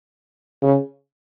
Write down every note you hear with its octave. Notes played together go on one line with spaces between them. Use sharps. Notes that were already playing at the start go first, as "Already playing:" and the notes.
C#3